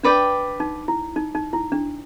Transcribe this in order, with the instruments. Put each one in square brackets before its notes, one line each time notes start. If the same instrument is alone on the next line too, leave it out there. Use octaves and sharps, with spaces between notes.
[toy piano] D4 [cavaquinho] B4 D5 G5
[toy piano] D#4
E4
D#4
D#4
E4
D4